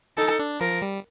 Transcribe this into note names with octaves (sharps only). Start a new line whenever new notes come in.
D#4 A4
D4
F3 A#4
G3